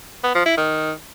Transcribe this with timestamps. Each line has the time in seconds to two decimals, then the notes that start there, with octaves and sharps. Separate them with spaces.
0.24 B3
0.35 F3
0.46 E4
0.57 D#3